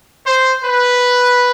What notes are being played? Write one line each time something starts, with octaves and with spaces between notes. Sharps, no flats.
C5
B4